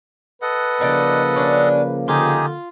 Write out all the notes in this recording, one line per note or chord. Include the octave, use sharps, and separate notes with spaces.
A4 B4 D#5 F#5
C#3 F3 A#3 D#4 D5
C#4 D4
D3 D#4 F4 G4 G#4